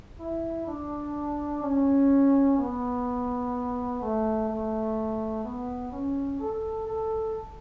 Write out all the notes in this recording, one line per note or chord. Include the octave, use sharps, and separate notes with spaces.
E4
D4
C#4
B3
A3
A3
B3
C#4
A4
A4